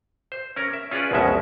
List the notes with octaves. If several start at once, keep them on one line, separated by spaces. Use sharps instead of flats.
C5
C#4 A#4
E5
C#4 F4 G#4 B4 D5
A#1 E2 B2 G#3 C#4 E5